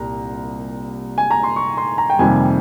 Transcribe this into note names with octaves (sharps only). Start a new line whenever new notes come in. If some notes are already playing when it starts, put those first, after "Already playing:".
Already playing: C2 A#2 A#5
G#5
A#5
C6
C#6
C6
A#5
G5
F2 C3 D#3 G3 A#3 G#5